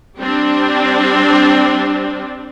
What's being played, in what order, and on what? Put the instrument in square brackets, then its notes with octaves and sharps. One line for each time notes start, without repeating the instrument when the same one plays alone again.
[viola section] G3 C4 D4